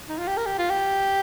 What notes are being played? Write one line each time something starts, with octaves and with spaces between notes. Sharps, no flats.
D#4
F4
G4
A#4
G4
F4
G4